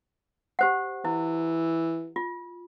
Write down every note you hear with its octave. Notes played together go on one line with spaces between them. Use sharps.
G4 C5 F#5
E3 E4
F4